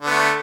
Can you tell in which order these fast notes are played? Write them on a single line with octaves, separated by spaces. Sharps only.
D3 B3 A3